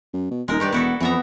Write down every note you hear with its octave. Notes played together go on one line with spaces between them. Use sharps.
F#2
B2
D#1 G#3 D#4 A#4
G2 D#3 G4 B4 D5
E1 B3 E4 F#4 A4
F2 E3 B3 E5 A#5